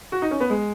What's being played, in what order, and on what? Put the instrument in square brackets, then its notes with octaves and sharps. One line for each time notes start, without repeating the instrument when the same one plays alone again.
[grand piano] F#4
D#4
C#4
B3
G#3